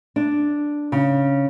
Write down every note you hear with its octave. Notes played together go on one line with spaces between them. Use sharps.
D4
C#3